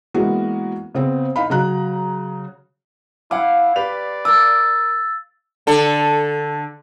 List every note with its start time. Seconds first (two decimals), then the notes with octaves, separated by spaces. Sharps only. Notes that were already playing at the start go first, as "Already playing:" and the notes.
0.14 E3 G#3 A#3 B3 C#4 F#4
0.95 C#3 B3 C4
1.36 D#4 F5 B5
1.50 C#3 F#3 A#5 F#6
3.31 E4 F5 F#5 D6
3.76 G4 B4 D5 F7
4.25 A#4 D6 E6 A6
5.67 D3 A4